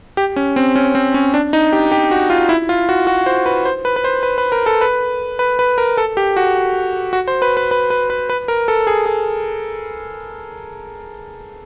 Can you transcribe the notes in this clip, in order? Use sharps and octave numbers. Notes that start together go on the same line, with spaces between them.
G4
C#4
C4
C#4
C4
C#4
D4
D#4
G4
G4
F#4
F4
E4
F4
F#4
F#4
C5
B4
C5
B4
B4
C5
B4
B4
A#4
A4
B4
B4
B4
A#4
A4
G4
F#4
F#4
C5
B4
B4
B4
B4
B4
B4
A#4
A4
G#4
G#4